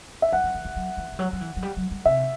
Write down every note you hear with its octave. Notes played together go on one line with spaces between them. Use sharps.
E5
F#3 F#5
F#3
E3
D3
F#3
E3
E3
F#3
F#3
E3
F#3
G3
F#3
G3
C3 E5